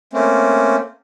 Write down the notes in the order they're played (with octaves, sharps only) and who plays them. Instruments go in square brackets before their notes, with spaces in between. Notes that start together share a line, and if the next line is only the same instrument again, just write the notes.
[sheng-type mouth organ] A3 A#3 C4 C#4